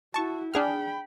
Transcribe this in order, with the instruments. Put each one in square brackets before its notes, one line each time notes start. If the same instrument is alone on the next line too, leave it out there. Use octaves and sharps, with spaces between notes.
[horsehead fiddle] E4 F#4 [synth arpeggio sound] A5 C#6
[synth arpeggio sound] D4 G#4 F6 [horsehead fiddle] G5 B5